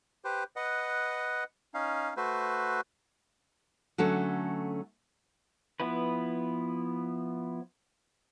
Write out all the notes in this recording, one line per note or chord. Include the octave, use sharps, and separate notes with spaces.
G4 B4 C5
B4 D#5 F#5
C#4 D#4 F5
A3 F#4 B4 C5
D3 F#3 A3 C#4
F3 B3 E4 B4